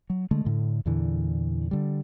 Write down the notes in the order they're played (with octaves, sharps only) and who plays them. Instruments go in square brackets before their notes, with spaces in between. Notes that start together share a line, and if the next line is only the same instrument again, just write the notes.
[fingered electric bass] F#3
D3 G#3 A3
A2 D3
E2 A#2 D3 E3
D3 G3